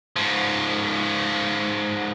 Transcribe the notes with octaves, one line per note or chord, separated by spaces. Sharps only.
G#2 F3